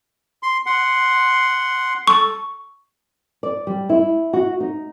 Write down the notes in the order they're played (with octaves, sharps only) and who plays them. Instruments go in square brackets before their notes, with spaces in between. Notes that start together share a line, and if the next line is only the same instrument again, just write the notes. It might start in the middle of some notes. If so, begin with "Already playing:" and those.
[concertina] C6
F#5 C6
[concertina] A4 [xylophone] C#6
[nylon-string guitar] D5
G3
E4
F#4
D#4